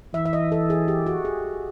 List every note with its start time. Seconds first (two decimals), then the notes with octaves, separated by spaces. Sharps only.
0.14 E3 E5
0.25 E5
0.33 D#5
0.52 A4
0.70 G#4
0.88 G4
1.06 F#4
1.25 G#4